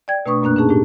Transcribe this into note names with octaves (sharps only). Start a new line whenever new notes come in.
D5 G5 G#6
B2 A3 D4 B4 C#6 D#6
F#2 A#2 A#3 D4 F#6
C#4 D#4 G#4 A5
A2 D4 G4